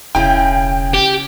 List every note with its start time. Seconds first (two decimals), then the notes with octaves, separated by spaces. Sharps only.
0.15 E1 C#3 E4 G5 G#5
0.94 G4 A5